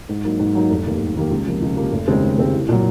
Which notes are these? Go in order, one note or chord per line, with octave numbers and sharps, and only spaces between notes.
G#2
F#3 A#3 D#4
G#2
F#3 A#3 D#4
F1
D#2 D#3 A#3
F1
D#2 D#3 A#3
C#2
C3 F3 A#3
C#2
C3 F3 A#3
F1
D#2 C#3 G#3 C4
F1
D#2 C#3 G#3 C4
C2
A#2 F#3